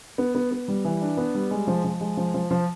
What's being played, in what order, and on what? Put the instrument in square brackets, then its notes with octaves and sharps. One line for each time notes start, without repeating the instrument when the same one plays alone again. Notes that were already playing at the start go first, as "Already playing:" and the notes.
[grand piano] B3
B3
B3
G3
E3
D4
B3
G3
G#3
F3
F3
G#3
F3
F3
F3